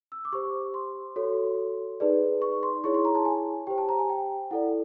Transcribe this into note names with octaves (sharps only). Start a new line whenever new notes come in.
E6
D6
G4 C5 C#6
C6
F#4 A4 C#5
D#4 G#4 B4 D5
C#6
C6
E4 G#4 C#5 C#6
C6
A#5
A5
G#5
G4 C5 G5
A5
A#5
G#5
G5
E4 A4 D5 F#5